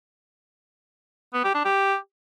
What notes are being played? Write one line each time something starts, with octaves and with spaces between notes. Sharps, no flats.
B3
G4
D4
G4